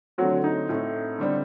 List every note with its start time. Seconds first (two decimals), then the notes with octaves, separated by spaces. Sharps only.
0.18 D3 F#3 A3 C4 F#4
0.44 D#4
0.69 A2 A3 C4
1.18 D3 G3 C4